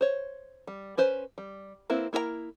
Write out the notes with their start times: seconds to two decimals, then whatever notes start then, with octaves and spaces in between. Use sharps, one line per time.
0.01 C5 C#5
0.67 G3
0.97 C#4 B4 C5 G#5
1.38 G3
1.90 A#3 C4 E4 B4
2.13 A#3 E4 A#4 D5 A#5